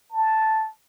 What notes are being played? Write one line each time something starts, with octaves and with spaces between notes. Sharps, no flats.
A5